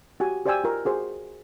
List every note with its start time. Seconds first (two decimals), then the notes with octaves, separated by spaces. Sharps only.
0.20 F#4 G4 G#5
0.46 G4 C5 D5 G5 G#5 E6
0.64 F4 A#4
0.85 F#4 G#4 C5